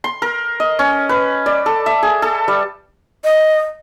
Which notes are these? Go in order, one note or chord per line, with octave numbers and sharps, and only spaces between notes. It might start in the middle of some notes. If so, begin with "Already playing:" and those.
C6
A#4
D#5
C#4
B4
D5
A4
E5
G#4
A4
G3
D#5